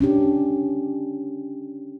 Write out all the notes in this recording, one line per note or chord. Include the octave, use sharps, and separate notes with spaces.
C#4 D4 G4